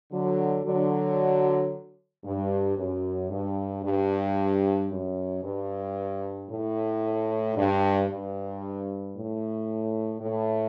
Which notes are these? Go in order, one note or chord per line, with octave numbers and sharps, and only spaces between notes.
D3 F#3
D3 F#3
G2
F#2
G2
G2
F#2
G2
A2
G2
G2
A2
A2